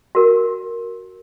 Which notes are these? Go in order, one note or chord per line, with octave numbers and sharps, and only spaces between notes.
F#4 A#4